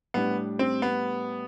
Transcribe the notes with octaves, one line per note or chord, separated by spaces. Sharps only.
A2 G3 B3 D4 G4
C4
B3